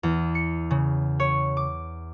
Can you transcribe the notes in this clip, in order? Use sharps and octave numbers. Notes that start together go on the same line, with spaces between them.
E2
C#7
C#3
C#5
D6